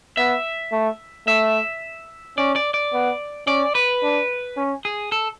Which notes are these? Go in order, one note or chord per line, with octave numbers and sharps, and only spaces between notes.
B3 E5
A3
A3 E5
C#4 D5
D5
D5
B3
C#4 D5
B4
D4
C#4
G#4
A4